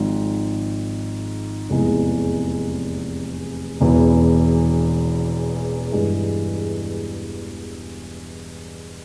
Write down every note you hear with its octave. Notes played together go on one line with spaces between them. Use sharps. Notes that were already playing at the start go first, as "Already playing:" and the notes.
Already playing: G#1 G#2 F3 G#3
F1 E2 E3 G#3
E1 E2 E3
G2 E3 G#3